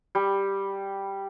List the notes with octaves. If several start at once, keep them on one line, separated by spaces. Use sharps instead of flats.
G3